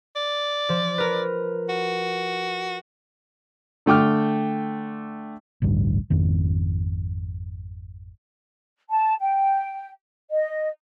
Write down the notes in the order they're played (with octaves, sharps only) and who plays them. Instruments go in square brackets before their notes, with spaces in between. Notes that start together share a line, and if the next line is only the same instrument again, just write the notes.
[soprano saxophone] D5
[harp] F3
A#4 B4
[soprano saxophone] F#4
[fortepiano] D3 A3 G5 D6 F6
[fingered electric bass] A1 D2 G2
G#1 F2 D#3
[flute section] A5
G5
D#5